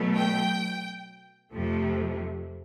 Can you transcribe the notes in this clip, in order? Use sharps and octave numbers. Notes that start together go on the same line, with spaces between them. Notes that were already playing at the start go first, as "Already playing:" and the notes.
Already playing: B2 F#3 A3
G5
F2 C3 F3 A3